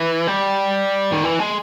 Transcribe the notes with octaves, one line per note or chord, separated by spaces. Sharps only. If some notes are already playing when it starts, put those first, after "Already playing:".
Already playing: E3
G3
D#3
E3
G#3